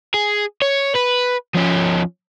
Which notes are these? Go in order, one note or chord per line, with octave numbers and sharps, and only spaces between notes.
G#4
C#5
B4
F3 C#4